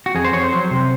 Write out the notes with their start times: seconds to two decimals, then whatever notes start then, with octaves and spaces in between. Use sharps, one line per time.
0.06 F#4
0.15 F2 G#4
0.25 C5
0.33 F2 C#5
0.43 C5
0.53 F#3
0.71 C3